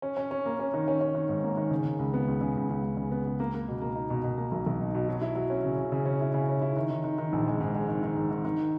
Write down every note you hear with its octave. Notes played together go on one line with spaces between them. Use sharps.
C#4
C#4
C#4
A#3
C#4
D#3
C#4
C#4
D#3
G#2
A#3
D#3
C#3
C#3
C#2
B3
C#2
C#3
C#2
C#2
C#2
C#3
B3
C#2
A#3
A#3
B2
A#3
D#4
B2
B2
A#3
B1
B1
D#4
B2
F#3
E4
F#3
C#4
C#3
C#3
C#3
C#4
E4
C#3
C#4
E4
D#3
D#3
D#3
D#3
A#1
G#3
G#2
G#3
D#3
D#3
G#2
D#3
D#3